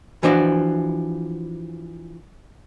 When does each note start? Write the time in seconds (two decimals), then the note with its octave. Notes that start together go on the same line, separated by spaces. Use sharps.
0.23 E3 F3 D4 F#4